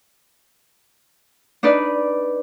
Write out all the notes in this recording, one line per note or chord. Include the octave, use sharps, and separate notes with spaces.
D4 D#4 B4 D5